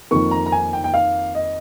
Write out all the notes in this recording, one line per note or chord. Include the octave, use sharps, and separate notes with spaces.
F2 D#3 A#3 C#6
A#5
A#5
G#5
G5
G5
F5
D#5